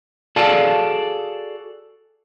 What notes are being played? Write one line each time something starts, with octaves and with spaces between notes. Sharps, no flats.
F#4 G#4 A4 D5 F5 A5